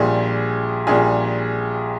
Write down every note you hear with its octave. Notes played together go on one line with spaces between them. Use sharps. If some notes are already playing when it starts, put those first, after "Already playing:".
Already playing: A#1 A#2 G3 G#4
A#1 A#2 G3 G#4